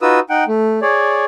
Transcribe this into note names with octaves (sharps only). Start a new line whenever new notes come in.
D#4 F4 F#4 B4 D#6 E6
D#4 F#5 G5
A3
G#4 C#5 D5